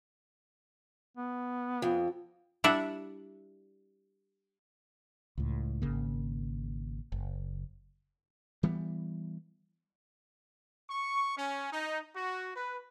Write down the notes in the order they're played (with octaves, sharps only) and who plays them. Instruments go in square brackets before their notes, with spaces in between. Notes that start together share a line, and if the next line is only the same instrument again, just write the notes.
[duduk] B3
[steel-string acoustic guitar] F2
[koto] G3 D4 E4 E5 F#5
[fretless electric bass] C#2 A2
G#1 C#3 A#3
F#1
[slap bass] E3 G3 B3
[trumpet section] C#6
C#4
D#4
F#4
B4